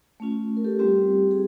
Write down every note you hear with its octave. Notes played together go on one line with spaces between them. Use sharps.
A3 C#4 F4
A#4
G4 A4
G3 C4 F4 G4
G#4